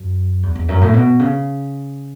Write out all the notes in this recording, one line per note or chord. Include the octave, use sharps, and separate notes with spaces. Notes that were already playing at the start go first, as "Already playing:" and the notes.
Already playing: F#2
E2
E2
F#2
A2
B2
C#3